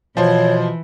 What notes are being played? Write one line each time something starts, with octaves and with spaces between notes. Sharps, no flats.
B2 E3 F3 C5 C#5